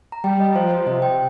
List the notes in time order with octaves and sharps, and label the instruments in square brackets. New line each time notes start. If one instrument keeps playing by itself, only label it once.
[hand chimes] A#5
[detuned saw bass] G3 [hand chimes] G5
[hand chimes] D#5
[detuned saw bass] F3 [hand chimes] C5
[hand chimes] C5
[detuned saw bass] C3 [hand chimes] D#5
[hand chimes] G5